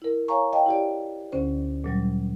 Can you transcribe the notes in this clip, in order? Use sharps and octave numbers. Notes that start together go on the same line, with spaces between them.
E4 A#4
C#5 F5 G#5 A#5 C#6
D#5 F5 G5 A5
E4 G4 D5
D2 D3 C#4 C5
A#2 F#3 G3